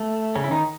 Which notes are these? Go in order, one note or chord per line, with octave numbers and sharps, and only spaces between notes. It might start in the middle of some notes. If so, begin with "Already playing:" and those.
Already playing: A3
C#3 C#4
E4
D#3 D#4